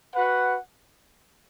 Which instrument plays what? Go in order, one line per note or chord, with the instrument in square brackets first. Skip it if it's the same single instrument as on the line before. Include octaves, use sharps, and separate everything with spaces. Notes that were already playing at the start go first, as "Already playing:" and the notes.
[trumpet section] F#4 B4 F#5